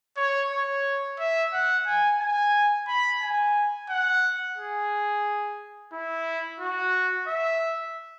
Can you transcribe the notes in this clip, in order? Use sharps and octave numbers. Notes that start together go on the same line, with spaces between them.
C#5
C#5
E5
F#5
G#5
G#5
B5
G#5
F#5
G#4
E4
F#4
E5